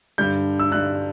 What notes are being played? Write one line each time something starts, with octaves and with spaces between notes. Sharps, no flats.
G2 D3 G3 G6
E6
G2 D3 G3 F#6